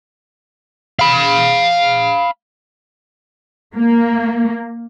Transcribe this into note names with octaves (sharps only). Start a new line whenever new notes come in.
F5 B5
A#3